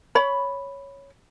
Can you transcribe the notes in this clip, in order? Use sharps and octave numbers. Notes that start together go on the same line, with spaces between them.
C#5 B5